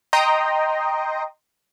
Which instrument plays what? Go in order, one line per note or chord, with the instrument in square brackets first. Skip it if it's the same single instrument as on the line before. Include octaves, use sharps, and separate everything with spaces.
[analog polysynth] D#5 G5 A#5 C6 D#6